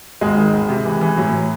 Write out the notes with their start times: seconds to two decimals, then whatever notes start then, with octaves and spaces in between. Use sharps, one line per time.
0.21 G#1 G#3
0.37 D#3
0.53 G#1
0.69 C3
0.85 E3
1.01 E3
1.17 A2 F#3